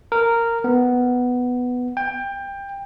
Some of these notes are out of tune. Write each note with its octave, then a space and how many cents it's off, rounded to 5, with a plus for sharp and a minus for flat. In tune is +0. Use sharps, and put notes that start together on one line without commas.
A#4 -10
B3 +5
G5 +20